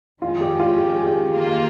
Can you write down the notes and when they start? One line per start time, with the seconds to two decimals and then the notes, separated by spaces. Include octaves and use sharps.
0.22 F2 D#3 G#3 C#4 F4
0.41 G4
0.60 F4
0.78 G4
0.92 G#4
1.06 G4
1.20 G#4
1.33 D#3 A#3 F4